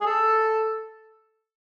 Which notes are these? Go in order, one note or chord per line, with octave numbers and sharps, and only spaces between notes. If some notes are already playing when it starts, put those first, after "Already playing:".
G#4
A4